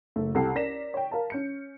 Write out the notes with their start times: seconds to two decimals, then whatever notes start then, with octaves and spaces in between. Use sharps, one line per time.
0.16 F#1 A3
0.35 C2 G4 A4 A5 C7
0.55 C#4 A#4 D5 A#6 B6 E7
0.94 C#5 G5
1.11 A#4 F5 A5
1.30 C#4 G6 C#7